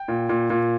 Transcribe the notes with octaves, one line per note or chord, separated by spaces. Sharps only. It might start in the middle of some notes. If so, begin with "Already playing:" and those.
Already playing: G5
A#2
A#2
A#2